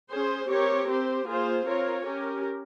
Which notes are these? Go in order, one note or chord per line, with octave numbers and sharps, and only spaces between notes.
C#4 G#4 C5
C4 G4 A#4 C#5
C4 G4 C5
A#3 F4 G#4 C5
C4 F4 A#4 C#5
C#4 G4 A#4